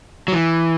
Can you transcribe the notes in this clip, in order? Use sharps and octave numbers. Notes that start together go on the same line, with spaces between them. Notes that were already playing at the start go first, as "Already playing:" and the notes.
F#3
E3